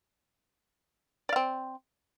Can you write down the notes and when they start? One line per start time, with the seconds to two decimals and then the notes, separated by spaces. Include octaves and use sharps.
1.29 D5
1.33 F5
1.36 C4